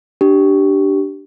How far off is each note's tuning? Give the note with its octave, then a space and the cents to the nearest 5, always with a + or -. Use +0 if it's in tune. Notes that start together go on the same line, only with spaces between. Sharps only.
D4 +0 G4 -15